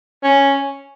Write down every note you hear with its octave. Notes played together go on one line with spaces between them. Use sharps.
C#4